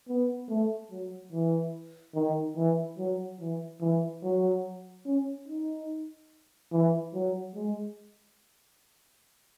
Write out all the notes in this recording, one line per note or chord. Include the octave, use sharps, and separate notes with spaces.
B3
A3
F#3
E3
D#3
E3
F#3
E3
E3
F#3
C#4
D#4
E3
F#3
G#3